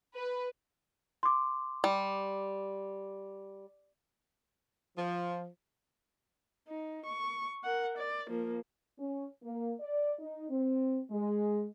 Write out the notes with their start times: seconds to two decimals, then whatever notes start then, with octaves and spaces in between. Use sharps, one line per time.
0.15 B4
1.23 C6 D6
1.84 G3
4.97 F3
6.68 D#4
7.06 C#6
7.64 A#4 F#5
7.98 D5
8.30 F3 A#3
8.99 C#4
9.43 A#3
9.80 D5
10.18 D#4
10.49 C4
11.11 G#3